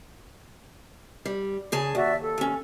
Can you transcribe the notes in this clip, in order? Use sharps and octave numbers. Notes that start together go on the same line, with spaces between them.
G3
C#3 G#4 A5
D#2 F#4 D5 E5
A4
D#2 C#4